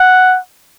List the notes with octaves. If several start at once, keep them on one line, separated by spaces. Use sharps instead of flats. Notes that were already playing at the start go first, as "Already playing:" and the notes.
Already playing: F#5